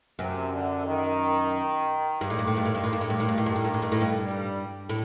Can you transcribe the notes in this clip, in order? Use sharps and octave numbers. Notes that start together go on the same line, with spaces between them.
F#2 C3
D3
D#3
G2 D#3
A2
G2
A2
G2
A2
G2
A2
G2
A2
G2
A2
G2
A2
G2
A2
G2
A2
G2
A2
G2
G3
A2